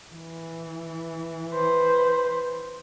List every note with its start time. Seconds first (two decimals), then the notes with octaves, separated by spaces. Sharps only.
0.11 E3
1.50 B4 C5